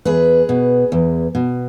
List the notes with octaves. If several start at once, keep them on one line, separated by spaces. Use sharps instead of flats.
E2 G#4 B4
B2
E2
B2